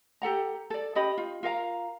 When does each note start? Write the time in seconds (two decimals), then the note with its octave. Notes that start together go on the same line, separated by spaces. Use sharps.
0.22 G4 A4 F#5 A#5
0.70 A4 D5
0.95 C#4 G4 D#5 B5
1.18 F4
1.43 F4 A#4 F5 A#5